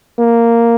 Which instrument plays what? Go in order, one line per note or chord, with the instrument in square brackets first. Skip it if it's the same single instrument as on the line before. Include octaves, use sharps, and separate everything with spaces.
[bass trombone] A#3